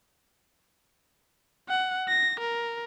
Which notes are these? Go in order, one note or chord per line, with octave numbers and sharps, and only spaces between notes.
F#5
A#6
A#4